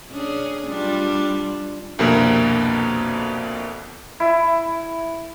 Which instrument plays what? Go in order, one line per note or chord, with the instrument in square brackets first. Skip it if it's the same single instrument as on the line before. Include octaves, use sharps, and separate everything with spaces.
[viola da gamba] C#4 D4 G#4
G3 D4 F4
[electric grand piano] C2 F2 B2 D3 A#3
[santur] E4